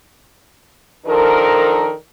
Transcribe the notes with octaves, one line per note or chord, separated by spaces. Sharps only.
D#3 F3 D4 A4 A#4